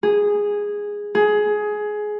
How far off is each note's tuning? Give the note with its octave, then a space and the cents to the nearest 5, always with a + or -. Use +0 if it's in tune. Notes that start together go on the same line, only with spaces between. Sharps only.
G#4 -10
G#4 +15